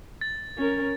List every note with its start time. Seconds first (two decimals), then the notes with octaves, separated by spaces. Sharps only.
0.21 A6
0.57 C#4 A#4